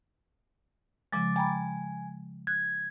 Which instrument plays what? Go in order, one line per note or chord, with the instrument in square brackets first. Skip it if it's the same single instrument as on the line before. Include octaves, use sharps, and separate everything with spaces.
[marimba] C#3 F3 G#3 [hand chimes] D6 A6
[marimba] G5 A#5 B5 [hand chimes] G#5
[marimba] F#6 [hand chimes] G#6